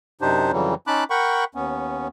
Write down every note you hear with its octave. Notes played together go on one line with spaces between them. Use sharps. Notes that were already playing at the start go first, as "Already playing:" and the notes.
F#2 C3 D4 D#4 G4 C5
F2 C#3 E3 F#3 G3
C#4 D#4 A5 B5 D6 F#6
A#4 F#5 G5 B5 C#6
D#2 B3 C#4